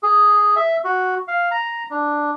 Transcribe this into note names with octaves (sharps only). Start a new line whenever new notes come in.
G#4
E5
F#4
F5
A#5
D4